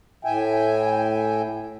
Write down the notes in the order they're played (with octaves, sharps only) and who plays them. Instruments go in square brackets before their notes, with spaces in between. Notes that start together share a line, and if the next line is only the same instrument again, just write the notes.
[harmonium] A2 E5 G5 G#5